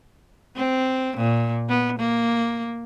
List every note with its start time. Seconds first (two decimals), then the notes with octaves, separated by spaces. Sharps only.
0.56 C4
1.17 A#2
1.69 B3
1.99 A#3